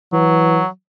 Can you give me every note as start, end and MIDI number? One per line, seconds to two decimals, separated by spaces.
0.13 0.60 52
0.13 0.67 54